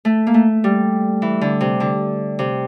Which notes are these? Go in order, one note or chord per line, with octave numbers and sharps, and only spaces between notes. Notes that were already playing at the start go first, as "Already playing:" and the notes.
A3
A#3
A3
G3
E3
D3
C3
D3
C3